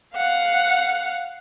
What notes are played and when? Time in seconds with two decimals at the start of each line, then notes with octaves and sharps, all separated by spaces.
0.14 F5 F#5